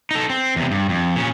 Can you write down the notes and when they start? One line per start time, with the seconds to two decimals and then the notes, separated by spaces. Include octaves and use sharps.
0.11 D#4 A4
0.30 C4
0.56 E2 C3
0.71 G2
0.89 F2
1.16 A#2 C#4